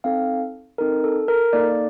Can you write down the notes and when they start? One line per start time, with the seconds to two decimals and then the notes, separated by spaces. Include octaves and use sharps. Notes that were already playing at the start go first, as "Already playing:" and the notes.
0.04 C4 D#4 A4 F5
0.78 C4 D#4 A4 A#4
1.04 A4
1.28 A#4
1.53 A#3 D#4 A4 D5